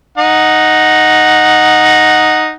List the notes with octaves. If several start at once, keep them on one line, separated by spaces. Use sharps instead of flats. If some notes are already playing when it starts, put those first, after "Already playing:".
D#4 F#5